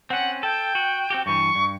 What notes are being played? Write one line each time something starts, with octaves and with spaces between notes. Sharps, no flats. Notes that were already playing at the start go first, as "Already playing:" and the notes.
C4 C#4 F#5
A4 G5
F#4
C4 F#4 G4
G2 E3 C#6
G2